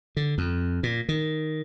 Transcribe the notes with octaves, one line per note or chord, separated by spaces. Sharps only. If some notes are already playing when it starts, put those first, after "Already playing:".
D3
F2
A#2
D#3